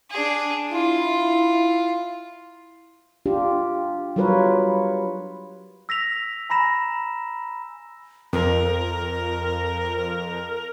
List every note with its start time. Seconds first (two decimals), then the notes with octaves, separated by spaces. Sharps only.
0.11 D4 G#4
0.73 E4 F4
3.26 D4 F4 G4
4.16 F#3 G3 F4 A#4 B4 C#5
5.89 E6 A#6 B6 F7
6.50 G#5 A#5 B5 A#6 E7
8.33 F2 A#4